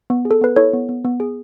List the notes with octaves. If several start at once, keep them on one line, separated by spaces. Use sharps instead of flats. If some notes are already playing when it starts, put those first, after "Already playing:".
B3
G#4
A4
B3 B4
E4 A4 C#5
B3
B3
B3
G#4